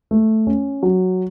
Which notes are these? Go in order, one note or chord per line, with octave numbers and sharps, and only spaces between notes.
A3
C#4
F#3